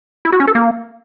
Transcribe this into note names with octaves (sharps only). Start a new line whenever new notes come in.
E4
F#4
C#4
A4
A#3